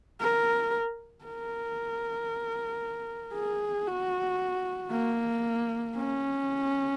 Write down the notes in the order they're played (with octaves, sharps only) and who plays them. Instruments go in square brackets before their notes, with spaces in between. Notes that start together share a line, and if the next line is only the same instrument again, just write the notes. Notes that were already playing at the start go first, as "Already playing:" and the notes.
[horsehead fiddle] A#4
A#4
G#4
F#4
A#3
C#4